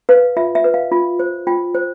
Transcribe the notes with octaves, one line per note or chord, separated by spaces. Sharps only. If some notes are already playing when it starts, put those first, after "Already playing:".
B4 F5
F4 E5
E5
B4
F5
F4
C5
F4 G5
C5